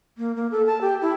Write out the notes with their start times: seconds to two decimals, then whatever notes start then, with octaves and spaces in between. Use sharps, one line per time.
0.18 A#3
0.36 A#3
0.51 A4
0.66 A5
0.81 G4
1.02 E4